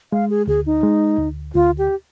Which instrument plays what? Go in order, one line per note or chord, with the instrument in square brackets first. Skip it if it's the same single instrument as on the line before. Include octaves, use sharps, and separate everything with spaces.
[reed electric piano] G#3 [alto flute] F5
[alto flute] G#4
[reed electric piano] D2 [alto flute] G#4
[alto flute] D#4
[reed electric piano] G#3
D2
[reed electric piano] D2 [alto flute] F4
[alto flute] G4